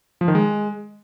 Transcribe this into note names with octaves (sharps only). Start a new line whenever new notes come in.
F3
D#3
G#3